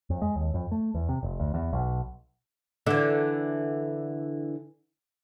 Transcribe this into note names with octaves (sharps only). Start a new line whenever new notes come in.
F2
G#3
D#2
F2
A3
E2
C3
F1
D2
E2
B1
D3 E3